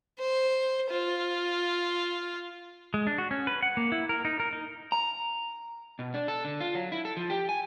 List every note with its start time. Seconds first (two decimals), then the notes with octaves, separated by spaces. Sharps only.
0.19 C5
0.91 F4
2.94 G#3
3.07 D4
3.18 F#4
3.31 C#4
3.47 B4
3.62 F#5
3.77 A#3
3.92 E4
4.09 A#4
4.25 D#4
4.40 A#4
4.53 D#4
4.92 A#5
5.99 B2
6.14 D4
6.28 A4
6.45 D3
6.60 F4
6.75 F#3
6.92 E4
7.05 A4
7.17 F3
7.30 G4
7.49 G#5